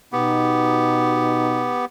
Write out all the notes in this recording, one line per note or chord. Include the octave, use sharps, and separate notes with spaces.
B2 B3 D#4 G4